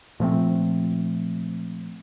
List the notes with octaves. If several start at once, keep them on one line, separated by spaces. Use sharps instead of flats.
A#2 F3 A3 C4